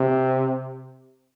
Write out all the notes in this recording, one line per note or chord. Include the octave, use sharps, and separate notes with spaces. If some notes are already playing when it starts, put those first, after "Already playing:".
Already playing: C3